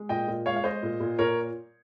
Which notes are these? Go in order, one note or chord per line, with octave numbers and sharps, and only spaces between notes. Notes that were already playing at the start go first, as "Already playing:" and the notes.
Already playing: G#3
A#2 D#5 G5
A#2
G#3 C#5 F5
F5
G#3 C5 D#5
A#2
A#2
A#2 A#4 C#5